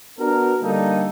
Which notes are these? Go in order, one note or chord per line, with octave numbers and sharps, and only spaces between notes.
B3 D4 F#4 A#4
D3 G3 A#3 D#4 A4